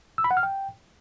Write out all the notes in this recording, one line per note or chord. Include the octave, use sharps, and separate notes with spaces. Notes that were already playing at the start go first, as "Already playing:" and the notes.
E6
B5
F#5
F6
G5